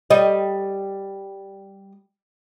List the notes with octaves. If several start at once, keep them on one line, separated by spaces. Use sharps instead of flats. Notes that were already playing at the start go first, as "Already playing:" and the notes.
G3 D#5